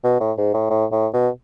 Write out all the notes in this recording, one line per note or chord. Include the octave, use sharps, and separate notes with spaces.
B2
A2
G#2
A2
A2
A2
B2